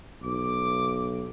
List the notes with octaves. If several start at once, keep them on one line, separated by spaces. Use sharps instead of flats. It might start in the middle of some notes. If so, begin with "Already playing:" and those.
B1 D6